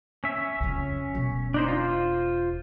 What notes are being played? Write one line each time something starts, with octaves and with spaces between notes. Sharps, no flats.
C#4 E5
F2 C#3
E1
D4 D#4 C5
F4 C5